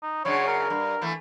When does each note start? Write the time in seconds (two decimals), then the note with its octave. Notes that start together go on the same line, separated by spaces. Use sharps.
0.03 D#4
0.25 F#2 C#3 D4 C#5
0.47 A#4
0.70 G2
1.01 E3 A3 A#3